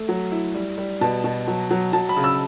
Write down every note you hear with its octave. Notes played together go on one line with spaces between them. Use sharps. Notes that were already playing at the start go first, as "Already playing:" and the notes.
Already playing: A3
F#3
E4
G3
G3
B2 A5
B2
F#3
F#3
F#3 A5
B5
C#3
E6